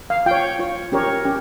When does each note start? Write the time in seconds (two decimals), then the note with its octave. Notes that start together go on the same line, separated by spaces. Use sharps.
0.10 F5
0.26 F4 C#5 G5
0.59 F4 C#5
0.92 C#4 G4 A#4 C#5
1.25 C#4 G4